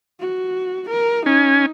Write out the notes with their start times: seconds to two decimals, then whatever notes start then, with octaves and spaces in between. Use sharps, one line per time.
0.20 F#4
0.89 A#4
1.26 C#4 D#4 G#5